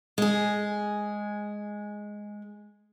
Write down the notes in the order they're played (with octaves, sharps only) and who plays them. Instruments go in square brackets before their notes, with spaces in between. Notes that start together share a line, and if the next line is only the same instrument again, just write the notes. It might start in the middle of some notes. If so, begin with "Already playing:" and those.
[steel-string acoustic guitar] G#3 G#4